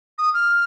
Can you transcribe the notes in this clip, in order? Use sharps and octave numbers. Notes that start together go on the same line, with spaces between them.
D#6
F6